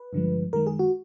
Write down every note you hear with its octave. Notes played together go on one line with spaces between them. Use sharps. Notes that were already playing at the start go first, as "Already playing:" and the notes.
Already playing: B4
G2 D3 F3 G#3
F#2 D#3 G#3 A#4
G#4
F#4